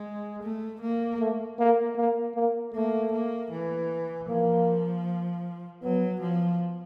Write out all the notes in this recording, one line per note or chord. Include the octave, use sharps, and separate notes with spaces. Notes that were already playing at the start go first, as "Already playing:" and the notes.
Already playing: G#3
A3
A#3
A3
A#3
A#3
A#3
A3 A#3
A#3
E3
F3 A#3
F#3 B3
F3